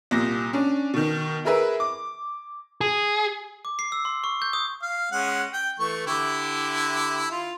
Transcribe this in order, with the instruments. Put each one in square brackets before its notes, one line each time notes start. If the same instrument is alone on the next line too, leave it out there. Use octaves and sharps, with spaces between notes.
[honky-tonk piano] C2 A#2 A#6
C#4 D4
B2 D#3
E4 G#4 A#4 B4 E5
D6
[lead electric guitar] G#4
[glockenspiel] D6
C7
E6
C6
C#6
G6
D#6
[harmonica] F5
G#3 C#4 F#5
G5
E3 A3 C#6
D3 E4 G4
F4